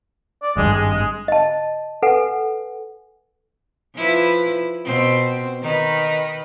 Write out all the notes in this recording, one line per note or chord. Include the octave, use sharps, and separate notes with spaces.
D5
G#1 G2 G#3
G#3
G#3
D#5 A5
A4 B4 F#5 G#5
F3 E4 B4
B2 C4
D#3 D#4 B4